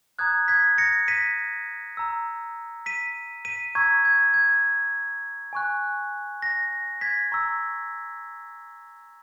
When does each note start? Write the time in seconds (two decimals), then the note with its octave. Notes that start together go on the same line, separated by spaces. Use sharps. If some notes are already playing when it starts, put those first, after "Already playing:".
0.19 A#5 D#6 F#6 G#6
0.48 G#6 B6
0.78 A#6 C#7
1.08 B6 D#7
1.97 A#5 E6
2.86 B6 D#7
3.45 B6 D#7
3.75 A#5 C#6 E6 G#6 B6
4.05 G#6
4.34 G#6
5.53 G#5 C#6 F#6
6.42 A#6
7.01 G#6 B6
7.32 A#5 C#6 E6